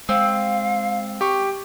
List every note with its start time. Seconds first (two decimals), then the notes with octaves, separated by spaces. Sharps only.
0.09 G#3 C4 F5
1.21 G4 C#6